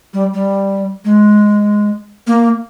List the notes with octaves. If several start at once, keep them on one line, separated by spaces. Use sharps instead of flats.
G3
G3
G#3
A#3